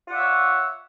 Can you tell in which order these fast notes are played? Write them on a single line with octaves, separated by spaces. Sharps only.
F4 F#5 D5 E5 C#5